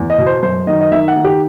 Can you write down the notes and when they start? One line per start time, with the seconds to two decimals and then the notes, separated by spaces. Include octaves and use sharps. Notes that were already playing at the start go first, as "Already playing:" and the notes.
Already playing: E2
0.10 D#5
0.18 B2
0.26 C5
0.42 F#2 C5
0.67 D#3 D#5
0.81 D#5
0.91 D#3 E5
1.08 F#5
1.16 D#3
1.24 G4